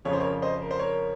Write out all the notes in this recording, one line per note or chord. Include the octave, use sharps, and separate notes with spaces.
F2 C#3 F3 C#5
C5
A#4 C#5
C5 D#5
A#4
C5
A#4 C#5